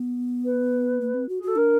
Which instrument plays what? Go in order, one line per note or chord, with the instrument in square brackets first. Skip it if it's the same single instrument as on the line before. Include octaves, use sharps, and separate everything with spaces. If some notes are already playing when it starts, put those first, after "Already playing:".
Already playing: [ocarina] B3
[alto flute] B4
[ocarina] A#3
C4
F#4
[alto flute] G#4
[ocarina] F#4 [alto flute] A4
[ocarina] D4 [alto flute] A#4